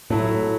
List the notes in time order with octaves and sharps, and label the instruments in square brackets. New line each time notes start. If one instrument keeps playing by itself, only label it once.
[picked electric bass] A2 [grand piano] F#3 A3 E4